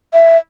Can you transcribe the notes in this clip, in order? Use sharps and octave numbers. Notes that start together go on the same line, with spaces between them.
E5